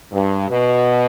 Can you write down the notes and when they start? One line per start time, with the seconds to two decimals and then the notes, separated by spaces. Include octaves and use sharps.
0.12 G2
0.49 B2